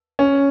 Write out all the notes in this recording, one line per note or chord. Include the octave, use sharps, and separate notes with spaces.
C#4